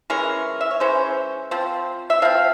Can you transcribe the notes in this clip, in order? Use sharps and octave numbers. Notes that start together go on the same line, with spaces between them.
E3 G#3 C#4 A#4
E5
C#5
E3 G#3 C#4 C5
F3 C4
E5
F3 C4 F5